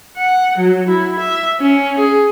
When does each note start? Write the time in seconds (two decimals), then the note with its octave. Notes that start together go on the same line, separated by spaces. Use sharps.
0.17 F#5
0.58 F#3
0.89 E4
1.20 E5
1.60 C#4
1.99 G#4